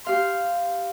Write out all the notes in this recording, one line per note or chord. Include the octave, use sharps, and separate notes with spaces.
G4 F5 C6